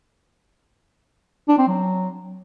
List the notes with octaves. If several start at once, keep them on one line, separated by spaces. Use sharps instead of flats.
D4
C4
F#3